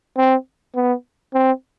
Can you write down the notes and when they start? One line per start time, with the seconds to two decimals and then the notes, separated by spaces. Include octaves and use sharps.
0.18 C4
0.75 B3
1.34 C4